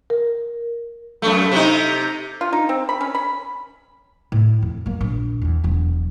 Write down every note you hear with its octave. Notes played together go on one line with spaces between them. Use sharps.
A#4
F#2 A3
C3 D#4
F4
D#4
C4
B5
C#4
B5
A2
F2
F#3 A#3
A#1
E2 E3
E1 F#3